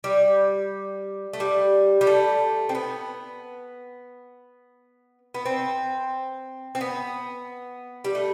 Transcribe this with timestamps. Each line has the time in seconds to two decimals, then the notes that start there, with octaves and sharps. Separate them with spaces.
0.04 G3
1.33 A3
1.40 G3
2.01 G3
2.07 A3
2.69 C4
2.75 B3
5.34 B3
5.46 C4
6.75 C4
6.81 B3
8.05 G3
8.15 A3